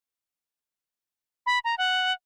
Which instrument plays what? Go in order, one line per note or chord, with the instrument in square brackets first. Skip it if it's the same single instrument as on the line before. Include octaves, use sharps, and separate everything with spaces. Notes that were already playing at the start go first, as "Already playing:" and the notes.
[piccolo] B5
A#5
F#5